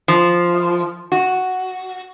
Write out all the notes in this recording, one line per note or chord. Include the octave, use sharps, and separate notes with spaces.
F3
F#4